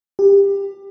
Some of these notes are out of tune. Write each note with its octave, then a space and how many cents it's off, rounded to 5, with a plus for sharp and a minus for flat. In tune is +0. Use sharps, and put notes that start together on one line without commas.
G4 +20